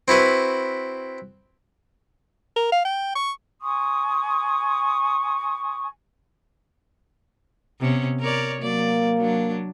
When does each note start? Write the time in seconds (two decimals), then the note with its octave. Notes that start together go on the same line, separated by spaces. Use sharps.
0.08 C4 E4 F#4 B4
2.56 A#4
2.72 F5
2.85 G5
3.16 C#6
3.60 G#5 C6 C#6 D#6
7.80 C3 B3 C#4
8.20 A#4 C#5 D5
8.61 F#3 A#3 D5
9.17 F#3 D4